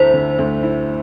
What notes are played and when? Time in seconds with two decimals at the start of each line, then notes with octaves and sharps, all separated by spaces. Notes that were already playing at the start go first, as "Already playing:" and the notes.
Already playing: D2 D3 A3 E4 C5
0.14 D3
0.39 D2
0.63 E4